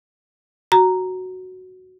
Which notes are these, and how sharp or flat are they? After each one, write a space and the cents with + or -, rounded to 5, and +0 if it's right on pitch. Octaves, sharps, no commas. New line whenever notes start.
F#4 +0 A#5 +0